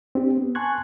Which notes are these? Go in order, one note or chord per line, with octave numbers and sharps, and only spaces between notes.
C4 D4 G4
B3
G#5 A5 C6 C#6 F#6 G#6